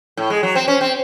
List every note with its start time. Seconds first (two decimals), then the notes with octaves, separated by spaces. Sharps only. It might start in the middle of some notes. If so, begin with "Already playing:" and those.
0.17 A2
0.30 G#3
0.43 F#3
0.55 C4
0.68 C#4
0.81 C4